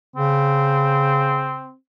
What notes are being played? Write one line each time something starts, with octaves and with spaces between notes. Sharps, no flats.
C#3 C4